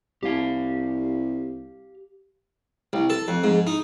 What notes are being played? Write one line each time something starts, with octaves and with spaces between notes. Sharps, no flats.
C2 G4 F5
C2
A4
F2
G#2
D#4